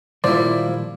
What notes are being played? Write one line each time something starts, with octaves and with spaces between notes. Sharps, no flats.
A#2 D#3 F3 G3 A#3 E4 C5 D5